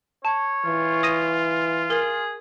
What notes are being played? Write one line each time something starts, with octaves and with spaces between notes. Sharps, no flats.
C#5 A5
E3 F4
D#6 A#6 D#7
G#4 A#4